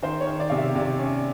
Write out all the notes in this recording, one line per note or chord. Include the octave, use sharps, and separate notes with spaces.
D#3 C5
C#5
D#3
D5
C3 F5
E5
C3 D5
C#4